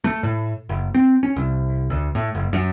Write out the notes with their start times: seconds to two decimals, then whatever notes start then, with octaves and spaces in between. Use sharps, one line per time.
0.04 A3
0.23 A2
0.69 F#1
0.94 C4
1.23 C#4
1.36 C2
1.90 D2
2.15 A2
2.35 F#1
2.53 F#2